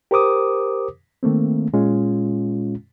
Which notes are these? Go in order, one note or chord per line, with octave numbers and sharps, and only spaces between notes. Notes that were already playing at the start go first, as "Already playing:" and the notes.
G4 A#4 C5 D6 D#6
D#3 A3 A#3 C4
A#2 G#3 C#4 F4